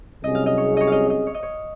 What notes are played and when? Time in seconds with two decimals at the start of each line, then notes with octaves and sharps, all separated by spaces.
0.24 C2 C3 F#3 C#4 G#4 D#5
0.35 F5
0.46 D#5
0.58 C#5
0.77 C#5 D#5
0.87 D#5 F5
1.10 D#5
1.27 C#5
1.34 D#5
1.43 C#5